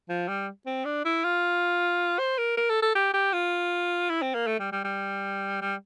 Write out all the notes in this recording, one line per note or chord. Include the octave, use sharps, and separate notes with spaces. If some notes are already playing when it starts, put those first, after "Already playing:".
F3
G3
C4
D4
E4
F4
C5
A#4
A#4
A4
A4
G4
G4
F4
E4
C4
A#3
A3
G3
G3
G3
G3